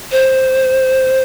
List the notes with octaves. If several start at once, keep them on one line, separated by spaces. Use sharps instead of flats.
C5